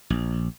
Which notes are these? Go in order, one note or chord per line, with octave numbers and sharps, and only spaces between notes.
A#1